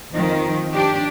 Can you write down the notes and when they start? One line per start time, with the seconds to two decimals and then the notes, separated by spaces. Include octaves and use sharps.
0.12 F2 D#3 F3
0.73 D4 G4